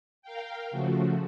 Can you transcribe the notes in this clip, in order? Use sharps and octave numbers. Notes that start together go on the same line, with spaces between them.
A#4 F5 G5
C#3 F3 A3 F#4